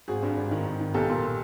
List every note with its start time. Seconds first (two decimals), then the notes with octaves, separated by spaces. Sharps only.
0.08 G#1 F#4 G#4
0.23 G2
0.37 G#1
0.51 D#3
0.66 G#1
0.80 D#3
0.94 B1 G4 A4
1.09 A#2
1.24 A#2